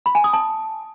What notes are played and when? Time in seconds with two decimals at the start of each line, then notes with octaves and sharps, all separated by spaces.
0.06 B5
0.15 G#5
0.24 D#6
0.33 A5